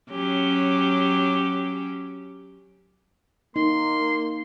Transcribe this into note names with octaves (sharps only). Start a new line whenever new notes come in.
F#3 C#4 G4
A#3 D#4 C6